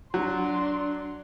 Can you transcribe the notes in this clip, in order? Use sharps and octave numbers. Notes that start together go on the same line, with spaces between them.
F#3 D4 C6